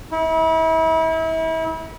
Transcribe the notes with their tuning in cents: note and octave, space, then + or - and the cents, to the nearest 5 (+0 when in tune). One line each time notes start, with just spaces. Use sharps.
E4 -35